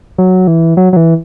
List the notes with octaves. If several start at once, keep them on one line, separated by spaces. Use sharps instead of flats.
F#3
E3
F#3
F#3
E3